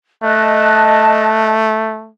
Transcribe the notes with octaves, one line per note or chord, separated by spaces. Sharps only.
A3 D#5 A5 F#6